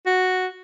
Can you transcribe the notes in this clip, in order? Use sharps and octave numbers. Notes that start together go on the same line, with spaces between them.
F#4